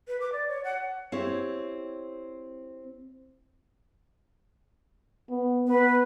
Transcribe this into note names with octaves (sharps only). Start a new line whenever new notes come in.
B4
D6
D5
C#5
F#5
C4 E4 G4 C#5
B3
B3 B4